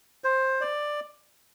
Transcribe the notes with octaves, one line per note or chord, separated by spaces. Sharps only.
C5
D5